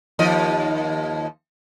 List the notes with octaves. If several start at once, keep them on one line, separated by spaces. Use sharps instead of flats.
D#2 F3 D#5